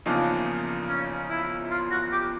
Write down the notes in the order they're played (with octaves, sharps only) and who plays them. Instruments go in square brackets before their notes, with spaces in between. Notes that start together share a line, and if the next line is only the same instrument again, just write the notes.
[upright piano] E2 C#3 F3 A#3 D#4 [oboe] D4
[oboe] C#4
E4
F4
F#4
G4